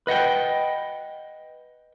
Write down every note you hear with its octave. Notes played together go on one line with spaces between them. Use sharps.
B4 D#5 F#5 G5